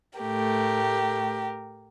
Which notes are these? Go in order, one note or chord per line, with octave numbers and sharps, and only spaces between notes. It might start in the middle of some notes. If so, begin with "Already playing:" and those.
A2 A3 G4 A#4